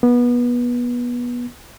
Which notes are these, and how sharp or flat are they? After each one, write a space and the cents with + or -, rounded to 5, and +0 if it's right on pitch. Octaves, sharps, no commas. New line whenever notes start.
B3 -25